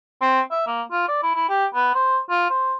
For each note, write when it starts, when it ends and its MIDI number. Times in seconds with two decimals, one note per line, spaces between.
0.21 0.40 60
0.51 0.65 76
0.67 0.82 58
0.91 1.06 65
1.08 1.18 74
1.23 1.31 64
1.36 1.44 64
1.49 1.65 67
1.75 1.92 59
1.95 2.19 72
2.30 2.49 65
2.50 2.75 72